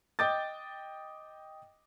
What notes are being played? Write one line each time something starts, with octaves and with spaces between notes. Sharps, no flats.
D#5 G5 D6 G6 A6